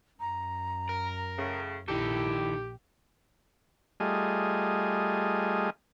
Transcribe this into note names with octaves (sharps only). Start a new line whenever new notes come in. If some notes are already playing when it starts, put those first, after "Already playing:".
F#2 A#5
A#4
A2 C#3
A#1 D#3 E4 G4 A4
G3 A3 F4 G#4 D#5